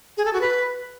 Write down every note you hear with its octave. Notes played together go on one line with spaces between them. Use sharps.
G#4
A4
F#4
B4